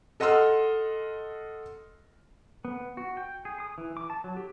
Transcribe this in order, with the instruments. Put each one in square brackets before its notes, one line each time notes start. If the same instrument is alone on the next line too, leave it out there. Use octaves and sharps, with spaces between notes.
[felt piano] A4 D#5 F#5 C6 E6 F6
[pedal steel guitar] B3
F#4
G5
G#4
D#6
E3
D6
A5
F#3
G4